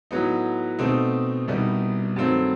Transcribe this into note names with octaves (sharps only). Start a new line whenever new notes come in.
A2 F#3 B3 D#4
B2 A3 C4 D#4
C2 B2 G3 D#4
G2 D#3 F#3 A3 C4